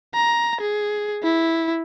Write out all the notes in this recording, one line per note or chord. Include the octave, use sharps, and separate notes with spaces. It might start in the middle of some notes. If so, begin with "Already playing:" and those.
A#5
G#4
E4